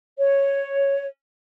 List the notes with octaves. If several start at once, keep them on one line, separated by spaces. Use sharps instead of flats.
C#5